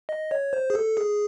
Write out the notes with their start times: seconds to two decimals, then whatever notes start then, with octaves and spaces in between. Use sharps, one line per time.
0.09 D#5
0.31 C#5
0.53 C5
0.70 G#4
0.75 A4
0.97 G#4